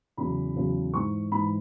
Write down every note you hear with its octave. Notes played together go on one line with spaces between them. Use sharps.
E2 C#3 F#3 B5
E2 C#3 F#3
G#2 E3 C#6
G#2 E3 B5